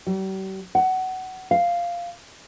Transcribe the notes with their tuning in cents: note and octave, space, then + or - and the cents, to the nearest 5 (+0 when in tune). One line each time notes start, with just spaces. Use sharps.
G3 -45
F#5 +20
F5 -5